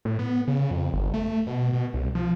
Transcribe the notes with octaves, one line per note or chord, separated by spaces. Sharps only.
A2
B3
C#3
F2
G1
A3
B2
B2
C2
F3